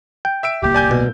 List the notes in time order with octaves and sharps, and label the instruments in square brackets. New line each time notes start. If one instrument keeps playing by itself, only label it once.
[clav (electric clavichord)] G5
[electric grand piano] E5 E6 D7
[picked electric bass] D1 C2 A#3 [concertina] G4
[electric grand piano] D5 G#5 G6
[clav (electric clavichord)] B2